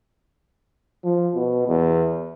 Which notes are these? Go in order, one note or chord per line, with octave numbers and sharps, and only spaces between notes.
F3
B2
E2